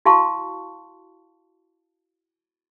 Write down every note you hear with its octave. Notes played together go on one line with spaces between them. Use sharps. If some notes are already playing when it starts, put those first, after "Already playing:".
E4 F#4 F5 A5 C6 C#6